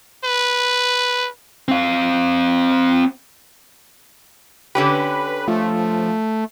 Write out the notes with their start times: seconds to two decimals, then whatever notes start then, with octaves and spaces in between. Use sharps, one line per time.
0.24 B4
1.68 C4 F5
4.75 D3 C#4 G4 B4
5.48 F3 A3